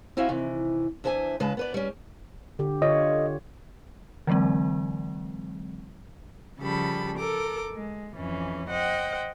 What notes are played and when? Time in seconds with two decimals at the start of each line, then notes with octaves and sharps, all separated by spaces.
0.17 C4 E4 F#4 E5 F5 G#5
0.29 C3 D#3 E3
1.04 E2 D4 C5 E5 G#5
1.40 C#3 G#3 B4 A5
1.57 B3 B4 D5
1.74 G3 C#4
2.59 D3 G4
2.82 D3 F4 C#5 D#5
4.27 D3 E3 F#3 G#3 C4
6.60 C#3 F3 G3 A4 B5
7.17 A4 A#4 D6
7.74 G#3
8.16 F2 E3 C#4
8.70 C5 D#5 F#5 G5